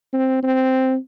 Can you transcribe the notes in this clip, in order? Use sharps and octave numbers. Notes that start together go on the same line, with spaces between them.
C4
C4